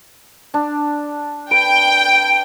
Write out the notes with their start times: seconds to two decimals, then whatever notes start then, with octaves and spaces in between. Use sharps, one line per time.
0.54 D4
1.51 B4 G5 D7